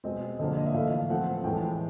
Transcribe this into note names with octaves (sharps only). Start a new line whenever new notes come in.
B2 G#3 C4 D#5
D3 F3 A#3 D#5
D5
D#5
E5
A2 E3 A3 F5
F5
A2 F3 A3 C4 F#5
A2 E3 G#3 G5